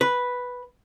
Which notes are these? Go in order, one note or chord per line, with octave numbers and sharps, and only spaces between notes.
B4